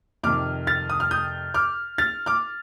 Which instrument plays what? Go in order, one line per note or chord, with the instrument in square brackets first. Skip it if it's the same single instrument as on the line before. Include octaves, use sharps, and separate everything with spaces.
[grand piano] F2 C3 D#3 D6 F6
F6 A6
D#6
F6
D#6 G6
D6 F6
F6 A6
D6 F6